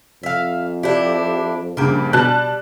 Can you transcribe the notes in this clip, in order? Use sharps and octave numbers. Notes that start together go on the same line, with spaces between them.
F2 E5 F5
D4 E4 G4
A#1 G2 C#3 A#3 G4
B2 G3 A5 F#6